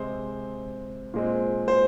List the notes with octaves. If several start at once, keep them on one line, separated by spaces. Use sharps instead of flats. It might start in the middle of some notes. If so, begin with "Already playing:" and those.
Already playing: C3 G#3 C4 C5
A#2 G#3 C4
C5